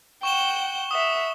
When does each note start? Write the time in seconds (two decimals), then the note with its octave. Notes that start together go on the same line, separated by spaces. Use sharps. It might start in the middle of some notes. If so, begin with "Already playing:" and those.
0.23 F#5 G5 C#6 E7 G7
0.91 E5 F#5 D#6